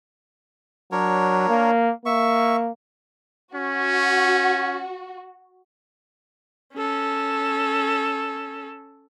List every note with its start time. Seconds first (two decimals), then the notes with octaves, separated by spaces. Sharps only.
0.92 F#3 D4 A#4 C#5
1.49 A#3
2.06 A#3 E5 C#6
3.55 C#4 F#4
6.74 C#4 A4